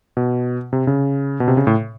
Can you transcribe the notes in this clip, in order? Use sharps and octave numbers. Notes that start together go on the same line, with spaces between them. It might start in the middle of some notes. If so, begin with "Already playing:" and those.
B2
C3
C#3
B2
C3
C#3
A2